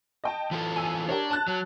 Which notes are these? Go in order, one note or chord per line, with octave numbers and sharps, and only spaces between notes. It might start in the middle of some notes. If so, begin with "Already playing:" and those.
D#5 G5 A5
E3 F4 A4
G#5 E6
D4 G4 A#4 C#5
A5 F#6 A6
F#3